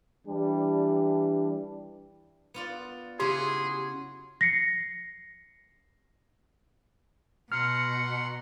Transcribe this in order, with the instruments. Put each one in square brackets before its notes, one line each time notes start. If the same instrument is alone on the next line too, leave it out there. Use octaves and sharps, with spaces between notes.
[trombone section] E3 G3 D4
[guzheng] B3 F4 D5
[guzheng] C#3 F#3 E4 [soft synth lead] G4 [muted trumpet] G#4 [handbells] C6
[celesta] A#6 C7 C#7
[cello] B2 [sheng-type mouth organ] F#5 A#5 C6 [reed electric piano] F6 [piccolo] C#7